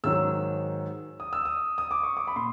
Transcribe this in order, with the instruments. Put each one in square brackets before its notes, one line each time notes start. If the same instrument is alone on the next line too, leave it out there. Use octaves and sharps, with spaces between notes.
[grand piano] G#2 D#3 F#3 E6
D#6
E6
D#6
D#6
D6
C#6
D6
B5
A#2 C6